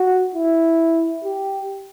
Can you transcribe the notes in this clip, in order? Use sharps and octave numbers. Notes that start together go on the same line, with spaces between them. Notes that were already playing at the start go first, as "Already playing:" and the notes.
Already playing: F#4
E4
G4